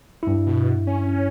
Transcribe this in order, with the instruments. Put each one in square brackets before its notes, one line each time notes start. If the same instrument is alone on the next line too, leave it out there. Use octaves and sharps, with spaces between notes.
[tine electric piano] G2 E4
[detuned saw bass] B2
C#4